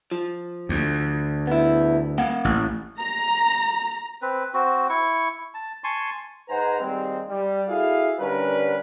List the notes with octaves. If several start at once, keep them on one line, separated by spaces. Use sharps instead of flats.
F3
D2
B3 E4
A#3 F5 F#5
A1
A#5
C4 B4
C4 F#4
E4 C#6
A5
G#5 A5 C6 C#6
G#2 B4 C5 F#5 G#5 A#5
D#2 G3 G#3 C4
G3
E4 F#4 G#4 A4 F5
D3 G3 C#4 A#4 B4